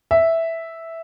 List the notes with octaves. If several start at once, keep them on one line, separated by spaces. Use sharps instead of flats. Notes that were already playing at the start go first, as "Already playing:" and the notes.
E5